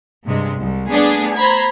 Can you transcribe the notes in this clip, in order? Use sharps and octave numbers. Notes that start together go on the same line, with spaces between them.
G2 C3 G#3
C2
A3 B3 D4 G#4
C5 A#5 B5 G#6